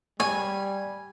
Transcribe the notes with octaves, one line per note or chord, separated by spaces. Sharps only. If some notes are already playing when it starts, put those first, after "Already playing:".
G3 C#5 G#5